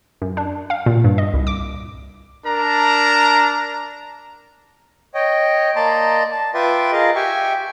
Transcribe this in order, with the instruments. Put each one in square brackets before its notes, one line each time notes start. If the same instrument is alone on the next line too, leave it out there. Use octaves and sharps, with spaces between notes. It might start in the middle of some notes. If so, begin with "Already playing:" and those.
[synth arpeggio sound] F#2
D4
F5
A#2
G2
D#5
C2
D6
[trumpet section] D4 A#4 A5 A#5
[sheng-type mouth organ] C#5 D#5 G5
A#3 D5 D#5 A5 A#5 C6
A5
F4 B4 E5 G5 C6 D6
F4 G#4 A#4 D#5 F5
G4 E5 G5 G#5 C#6